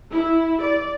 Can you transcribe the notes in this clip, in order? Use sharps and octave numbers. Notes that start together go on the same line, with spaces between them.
E4
D5